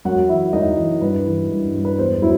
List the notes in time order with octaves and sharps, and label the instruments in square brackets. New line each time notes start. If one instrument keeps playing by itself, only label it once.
[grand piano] F#2 F#4 F#5
E3 E4 E5
F#2 D#4 D#5
E3
G2 B4
E3
G2
G2
B4
E2 C5
F#3 E4